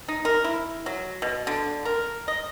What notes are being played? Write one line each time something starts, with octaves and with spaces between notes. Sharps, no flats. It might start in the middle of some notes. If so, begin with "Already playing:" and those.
D#4
A#4
E4
F#3
B2
D3
A#4
D#5